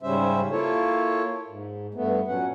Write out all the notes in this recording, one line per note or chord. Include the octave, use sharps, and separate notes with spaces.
G#2 C#3 G3 C#4 C5 E5
A#3 E4 F4 A4 C#5
G#2
G2 A3 B3
A#2 F#3 C#4 F#5